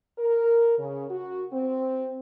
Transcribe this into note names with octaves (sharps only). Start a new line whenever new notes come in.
A#4
C#3
F#4
C4